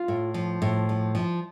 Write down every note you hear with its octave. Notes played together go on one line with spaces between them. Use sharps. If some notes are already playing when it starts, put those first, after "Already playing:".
Already playing: F4
A2
F3
A2
F3
F3